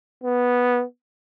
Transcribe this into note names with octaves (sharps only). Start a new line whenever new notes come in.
B3